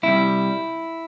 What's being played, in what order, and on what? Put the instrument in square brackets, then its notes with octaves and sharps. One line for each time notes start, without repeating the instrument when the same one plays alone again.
[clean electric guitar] C2 C3 G3 E4